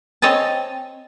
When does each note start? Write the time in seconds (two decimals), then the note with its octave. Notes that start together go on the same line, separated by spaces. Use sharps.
0.22 C4 C#5 D#5 G#5 A5